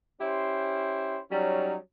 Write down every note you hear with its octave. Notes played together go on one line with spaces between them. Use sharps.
C#4 E4 G4 C5
F#3 G3 C#4 D#4